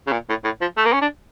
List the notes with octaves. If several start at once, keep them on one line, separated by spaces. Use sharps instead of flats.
C#3
A#2
A2
A2
F3
A3
A#3
C#4
D4